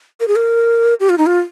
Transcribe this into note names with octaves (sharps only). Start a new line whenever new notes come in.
A#4
G#4
A#4
G4
F4
D#4
F4